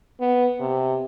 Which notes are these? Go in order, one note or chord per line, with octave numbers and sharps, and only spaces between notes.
B3
C3